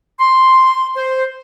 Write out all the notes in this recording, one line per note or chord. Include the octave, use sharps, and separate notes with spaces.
C6
C5